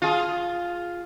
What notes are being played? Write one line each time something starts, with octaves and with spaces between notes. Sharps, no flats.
F4 G#4